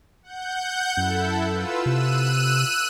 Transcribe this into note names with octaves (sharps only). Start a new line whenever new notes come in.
F#5 G6
F#2 E4 A4
F4 B4 E6
C3 E6 F#6 D#7